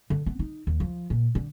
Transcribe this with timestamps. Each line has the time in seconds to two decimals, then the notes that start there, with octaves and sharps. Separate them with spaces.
0.10 D3
0.26 B3
0.39 D#4
0.67 D#2
0.80 F3
1.10 A#2
1.35 D3